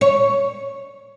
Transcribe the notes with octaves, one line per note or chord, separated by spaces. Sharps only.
C#5